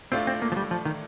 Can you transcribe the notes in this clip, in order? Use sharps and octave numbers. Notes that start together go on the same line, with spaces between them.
A2 A3 C4 D4 F4
C4
A#3
F3
G3
F3
D#3